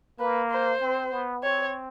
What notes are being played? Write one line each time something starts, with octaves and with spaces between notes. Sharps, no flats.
A#3 B4
C5
C4
B3
C4 C#5